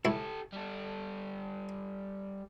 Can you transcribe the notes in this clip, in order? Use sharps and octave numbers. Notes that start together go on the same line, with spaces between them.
C#2 E4 G4 A4
G3 A4